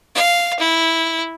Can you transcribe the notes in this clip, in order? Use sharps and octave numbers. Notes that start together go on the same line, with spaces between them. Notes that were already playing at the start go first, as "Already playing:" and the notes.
F5
E4